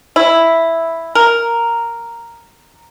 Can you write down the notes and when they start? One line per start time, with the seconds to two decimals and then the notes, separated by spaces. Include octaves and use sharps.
0.16 E4
1.15 A#4